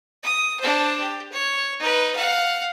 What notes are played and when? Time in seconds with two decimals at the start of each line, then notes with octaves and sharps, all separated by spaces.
0.23 D#6
0.60 D4 C5
1.00 G4
1.32 C#5
1.80 D#4 B4
2.15 F5 F#5